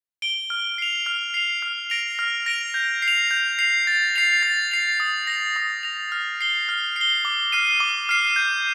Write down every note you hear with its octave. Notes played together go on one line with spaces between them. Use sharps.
D7 G7
F6
C7 F7
F6
C7 F7
F6
A#6 D7 F7
F6
A#6 D7 F7
G6
C7
F7
G6
C7 F7
A6
C7 F7
A6
C7 F7
D#6
A#6 F7
D#6
A#6 F7
F6
C7 G7
F6
C7 G7
D6
F6 C7 D#7
D6
F6 C7 D#7
G6